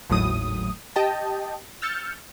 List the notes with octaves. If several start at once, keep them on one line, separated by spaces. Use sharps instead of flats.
G#1 D#2 A2 F#3 D#6
G4 D#5 G5 A5
E6 F6 G6 A6 C#7